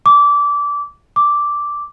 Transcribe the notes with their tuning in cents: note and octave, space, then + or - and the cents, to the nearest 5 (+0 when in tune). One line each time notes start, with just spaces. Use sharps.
D6 -20
D6 -5